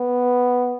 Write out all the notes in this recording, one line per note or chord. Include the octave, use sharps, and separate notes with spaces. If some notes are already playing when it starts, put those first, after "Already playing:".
Already playing: B3